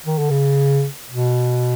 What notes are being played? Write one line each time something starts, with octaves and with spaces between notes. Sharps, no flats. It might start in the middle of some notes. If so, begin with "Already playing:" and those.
D#3
D3
C#3
B2